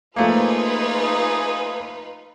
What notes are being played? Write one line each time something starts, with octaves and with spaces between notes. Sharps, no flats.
F3 A3 A#3 D#4 F4 G#4 B4